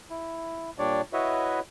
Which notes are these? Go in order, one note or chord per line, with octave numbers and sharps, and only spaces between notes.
E4
A#2 G3 D4 C#5 D5
E4 F#4 B4 C#5 D#5 E5